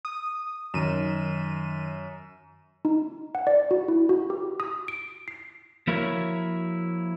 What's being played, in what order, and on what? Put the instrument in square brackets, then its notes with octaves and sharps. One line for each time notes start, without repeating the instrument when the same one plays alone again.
[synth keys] D#6
[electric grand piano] F#2 [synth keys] D#3 D#7 E7
[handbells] D#4
F#5
D5
F#4
E4
F#4
G4
D#6
D7
C7
[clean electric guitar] F3 A#3 E4 F#4 A#4 C#5